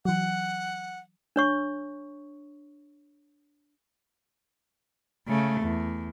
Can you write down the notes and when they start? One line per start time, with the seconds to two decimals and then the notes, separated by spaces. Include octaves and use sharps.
0.05 E3 F#3 F#5
1.36 D4 C#5 C#6
5.28 C#3 A3
5.61 E2